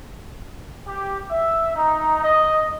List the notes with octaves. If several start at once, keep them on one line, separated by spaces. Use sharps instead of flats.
G4
E5
D#4
D#5